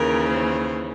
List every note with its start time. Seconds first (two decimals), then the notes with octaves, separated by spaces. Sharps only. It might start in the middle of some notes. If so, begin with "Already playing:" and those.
Already playing: D#2 C#3 E3 A#4
0.29 C5